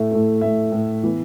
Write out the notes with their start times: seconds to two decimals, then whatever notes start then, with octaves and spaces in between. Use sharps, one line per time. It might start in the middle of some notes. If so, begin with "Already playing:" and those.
Already playing: A2 A3 E5
0.11 A2 A3
0.41 A2 A3 E5
0.72 A2 A3
1.03 E3 B3